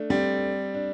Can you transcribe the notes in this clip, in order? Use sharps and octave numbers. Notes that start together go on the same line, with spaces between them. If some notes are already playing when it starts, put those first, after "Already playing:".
Already playing: A3 D4
G3 C4
D4